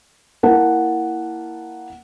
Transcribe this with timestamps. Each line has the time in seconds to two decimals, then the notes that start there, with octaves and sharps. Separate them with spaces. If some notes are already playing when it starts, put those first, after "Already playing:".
0.43 A#3 E4 A#4 F#5 A5